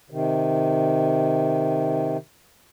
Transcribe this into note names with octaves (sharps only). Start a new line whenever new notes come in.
C3 D#3